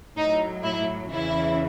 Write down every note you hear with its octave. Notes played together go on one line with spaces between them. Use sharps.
A2 F#3 D#4
E4
E2 C#3 E3 E4